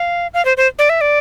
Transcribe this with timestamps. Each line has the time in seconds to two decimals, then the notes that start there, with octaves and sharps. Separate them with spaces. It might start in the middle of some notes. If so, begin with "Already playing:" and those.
Already playing: F5
0.34 F5
0.45 C5
0.57 C5
0.79 D5
0.89 E5
1.01 D5